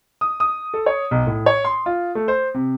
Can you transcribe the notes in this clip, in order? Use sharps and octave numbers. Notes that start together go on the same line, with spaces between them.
D#6
D#6
A4
C#5
B1
A2
C#5
C6
F4
A3
C5
C3